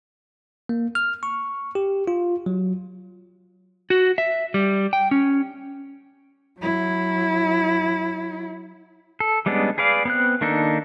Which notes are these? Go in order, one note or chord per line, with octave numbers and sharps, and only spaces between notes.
A#3
F6
C#6
G4
F4
F#3
F#4
E5
G3
G5
C#4
F#3 E4
A4
G3 G#3 B3 C#4 D4
G#4 B4 D5 F5
B3 C4 F#6
D#3 A#3 D4 D#4 A4